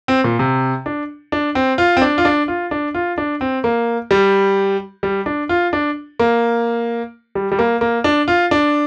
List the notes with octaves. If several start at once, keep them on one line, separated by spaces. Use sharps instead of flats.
C4
A#2
C3
D4
D4
C4
F4
C4
D4
F4
D4
F4
D4
F4
D4
C4
A#3
G3
G3
D4
F4
D4
A#3
G3
G3
A#3
A#3
D4
F4
D4